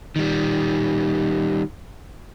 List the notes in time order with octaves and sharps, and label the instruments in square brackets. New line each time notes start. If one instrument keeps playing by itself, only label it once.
[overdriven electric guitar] D#3 G3